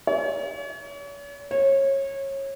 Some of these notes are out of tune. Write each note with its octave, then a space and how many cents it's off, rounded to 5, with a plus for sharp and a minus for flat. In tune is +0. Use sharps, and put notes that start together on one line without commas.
C#5 +40
C#5 -25